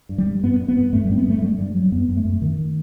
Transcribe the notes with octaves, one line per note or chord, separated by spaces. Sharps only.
G2
G3
G2
G2 B3
G2
B3
G2
G2 A3
G3
G2 C4
B3
G2 A3
G2 G3
G2 G3
G2 F#3
F#2 B3
F#2
A3
F#2
F#2 D#3